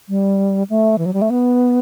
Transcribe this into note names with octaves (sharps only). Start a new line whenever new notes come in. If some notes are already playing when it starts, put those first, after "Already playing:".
G3
A3
E3
F#3
G3
A3
B3